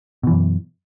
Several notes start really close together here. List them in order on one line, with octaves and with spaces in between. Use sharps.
B2 E3 F#2